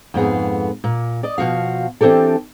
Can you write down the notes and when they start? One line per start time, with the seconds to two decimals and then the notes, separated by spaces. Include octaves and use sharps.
0.14 F2 G#2 B3 G#4
0.84 A#2
1.23 D5 D#5
1.38 B2 F3 F#4 F5
2.01 E3 C4 D4 G4 A4